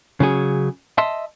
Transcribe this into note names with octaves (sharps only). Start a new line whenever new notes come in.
C#3 F#3 G#4
D#5 E5 A5 C6